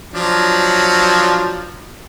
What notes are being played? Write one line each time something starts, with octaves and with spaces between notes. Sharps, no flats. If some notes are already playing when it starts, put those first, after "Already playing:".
F3 F#3 D4